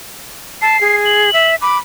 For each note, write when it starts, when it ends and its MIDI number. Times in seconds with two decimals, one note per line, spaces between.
0.62 0.79 81
0.62 0.97 96
0.81 1.33 68
1.05 1.50 102
1.33 1.55 76
1.62 1.78 83
1.62 1.77 86